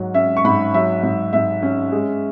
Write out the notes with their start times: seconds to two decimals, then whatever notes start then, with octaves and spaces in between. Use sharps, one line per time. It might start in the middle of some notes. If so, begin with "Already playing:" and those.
Already playing: G#2 F#3
0.14 C#4 E5
0.37 C#6
0.45 G#2 B5
0.74 F#3 E5
1.03 G#2
1.33 G#2 E5
1.62 C#4
1.92 G#3